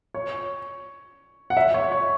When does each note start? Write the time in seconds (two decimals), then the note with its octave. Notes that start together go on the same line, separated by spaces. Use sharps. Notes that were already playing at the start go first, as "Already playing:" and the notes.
0.14 C#5
1.50 F#5
1.57 E5
1.74 C#5
1.92 C#5